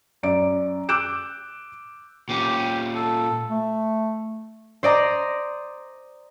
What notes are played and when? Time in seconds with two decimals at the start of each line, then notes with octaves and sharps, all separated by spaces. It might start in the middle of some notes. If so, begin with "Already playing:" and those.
0.23 F#2 D5 D7
0.89 D6 E6 F#6 G6 D7 E7
2.29 A#2 C#4 G4
2.95 A4
3.48 A3
4.83 C5 D5 D#5 A#5